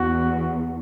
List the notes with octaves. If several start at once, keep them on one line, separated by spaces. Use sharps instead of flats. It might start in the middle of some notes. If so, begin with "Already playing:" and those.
Already playing: E2 F#4